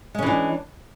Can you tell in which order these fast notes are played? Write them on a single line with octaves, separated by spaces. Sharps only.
G#3 C#4 E3 D4